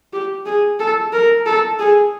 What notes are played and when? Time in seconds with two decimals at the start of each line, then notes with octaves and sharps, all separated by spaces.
0.13 G4
0.45 G#4
0.80 A4
1.13 A#4
1.46 A4
1.79 G#4